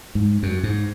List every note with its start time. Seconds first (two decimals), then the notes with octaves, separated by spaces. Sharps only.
0.15 G#2
0.43 F#2
0.63 G#2